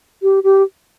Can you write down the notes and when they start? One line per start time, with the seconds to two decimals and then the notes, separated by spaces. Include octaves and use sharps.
0.23 G4
0.44 G4